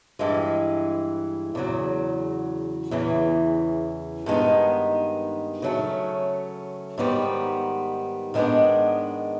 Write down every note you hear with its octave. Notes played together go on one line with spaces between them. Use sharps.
G2 E3 G#3
E2 C#3 F#3
E2 C#3 E3
G2 D#3 G#3 B3 D#4
C#3 F#3 A3 C#4
G#2 D#3 G3 B3
G#2 D#3 G#3 B3 D4